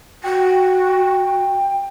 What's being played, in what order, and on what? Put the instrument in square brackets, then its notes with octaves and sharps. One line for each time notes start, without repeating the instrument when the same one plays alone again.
[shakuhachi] F#4 [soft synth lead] G5